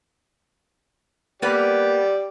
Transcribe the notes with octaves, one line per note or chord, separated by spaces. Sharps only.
A#3 B3 G4 B4 D5